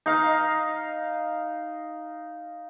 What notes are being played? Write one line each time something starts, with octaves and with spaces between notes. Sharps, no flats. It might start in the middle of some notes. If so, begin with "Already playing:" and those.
D#4 F5